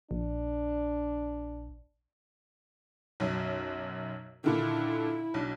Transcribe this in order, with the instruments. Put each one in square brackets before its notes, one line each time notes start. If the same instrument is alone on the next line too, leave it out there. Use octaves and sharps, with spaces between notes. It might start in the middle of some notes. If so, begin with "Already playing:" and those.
[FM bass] A#1 [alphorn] D4
[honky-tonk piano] B1 F#2
[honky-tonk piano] A#2 D3 D#3 [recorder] E4
[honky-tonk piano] B1 D4